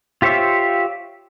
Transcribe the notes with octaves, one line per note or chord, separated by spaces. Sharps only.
F4 G4 C5 C#5 E5